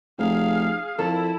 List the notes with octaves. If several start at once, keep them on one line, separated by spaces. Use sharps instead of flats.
F1 G#4 F5
F2 E4 A4